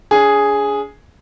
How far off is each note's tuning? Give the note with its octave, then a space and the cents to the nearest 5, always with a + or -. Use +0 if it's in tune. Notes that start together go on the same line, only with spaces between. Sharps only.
D4 -40 G#4 +0